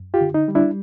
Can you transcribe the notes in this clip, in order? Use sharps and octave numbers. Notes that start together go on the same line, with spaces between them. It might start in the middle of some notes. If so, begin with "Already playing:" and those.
Already playing: F#2
F4 G4
D3
D#4
G3
D4 E4